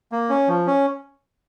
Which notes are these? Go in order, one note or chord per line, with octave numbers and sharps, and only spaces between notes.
A#3
C#4
F3
C#4